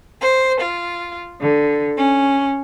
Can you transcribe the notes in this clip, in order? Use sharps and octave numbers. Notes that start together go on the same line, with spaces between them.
C5
F4
D3
C#4